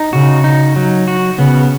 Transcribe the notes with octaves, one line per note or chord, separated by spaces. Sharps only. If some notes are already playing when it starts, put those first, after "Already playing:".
Already playing: D#4
C#3 F#4
D#4
F#3
F#4
C#3 B3